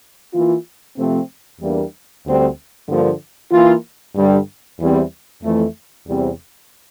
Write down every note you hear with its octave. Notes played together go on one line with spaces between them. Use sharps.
E3 A#3 F4
C3 F3 A3 C4
E2 E3 G3 A#3 D4
D2 D3 G3 C4
G2 D3 F3 A#3
E3 A#3 F4
G2 D3 G3
E2 E3 G3 C4
F2 E3 A3
E2 C3 G3 C4